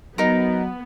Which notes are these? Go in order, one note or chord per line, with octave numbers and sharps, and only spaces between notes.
F#3 B3 D#4 A#4